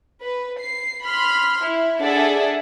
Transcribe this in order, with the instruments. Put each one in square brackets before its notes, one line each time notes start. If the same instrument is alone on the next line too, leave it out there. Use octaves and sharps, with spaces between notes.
[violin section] B4
C7
B5 C6 F6
E4
D4 G#4 A4 D5 E5 F#5